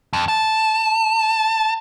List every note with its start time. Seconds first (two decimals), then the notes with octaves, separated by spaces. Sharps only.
0.13 F2
0.28 A5